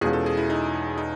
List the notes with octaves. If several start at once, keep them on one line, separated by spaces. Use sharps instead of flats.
E2 B2 G#3 C#4 F4 G#4
A4
G#4
E4
D#4
D#4